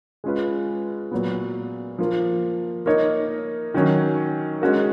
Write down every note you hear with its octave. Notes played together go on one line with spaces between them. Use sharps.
G#3 C#4 F4 B4
A#2 F#3 B3
F3 A#3 F4
A#3 D#4 A#4 C#5
D#3 F#3 C#4
G#3 C#4 F#4 A#4